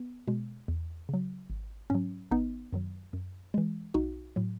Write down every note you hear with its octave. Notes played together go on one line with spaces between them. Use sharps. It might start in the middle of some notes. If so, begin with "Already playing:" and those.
Already playing: B3
B2 G#3
E2
C#3 F#3
G#1
G#2 F#3 C#4
G#1 B3 D#4
F#2 D#3 F#3
F#2
E3 G#3
B1 D#4 F#4
A2 F#3